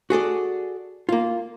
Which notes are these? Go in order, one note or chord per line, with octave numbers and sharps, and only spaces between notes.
F#4 G#4 A4 D5
A#3 F4